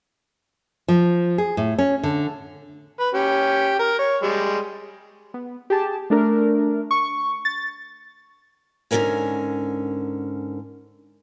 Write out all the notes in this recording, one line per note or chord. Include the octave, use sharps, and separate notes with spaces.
F3
G#4
A2
C#4
D3
B4
C#4 G4
A#4
C#5
G3 G#3
B3
G4 G#4 A5
A3 D4 A#4
C#6
A6
G#2 D3 D#3 C#4 A#4 G#5